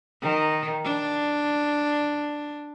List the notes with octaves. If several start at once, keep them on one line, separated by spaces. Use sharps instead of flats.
D#3
D4